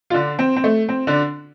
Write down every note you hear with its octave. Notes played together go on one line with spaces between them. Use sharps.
F4
D3 D4
C4
C4
A3
C4
D3 D4